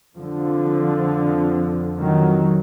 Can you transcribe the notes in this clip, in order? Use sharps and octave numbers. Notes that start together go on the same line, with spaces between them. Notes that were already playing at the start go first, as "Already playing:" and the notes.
F2 D3 F3
D#3 F#3